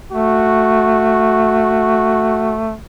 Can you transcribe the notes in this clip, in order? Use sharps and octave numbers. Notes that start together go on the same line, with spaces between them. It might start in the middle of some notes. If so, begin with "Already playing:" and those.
A3 F#4